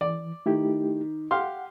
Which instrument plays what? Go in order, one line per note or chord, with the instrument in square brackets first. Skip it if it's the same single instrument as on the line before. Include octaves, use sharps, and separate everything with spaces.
[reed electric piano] E3 [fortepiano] D5
[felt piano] D#3 [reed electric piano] A3 E4 G4
[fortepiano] G4 F5 C6 [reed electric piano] F#5